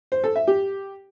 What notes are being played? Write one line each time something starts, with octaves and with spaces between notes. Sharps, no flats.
C5
A4
E5
G4